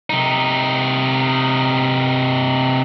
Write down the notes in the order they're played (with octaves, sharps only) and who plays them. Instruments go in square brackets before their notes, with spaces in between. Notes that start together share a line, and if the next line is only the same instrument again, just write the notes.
[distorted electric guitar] C3 D#4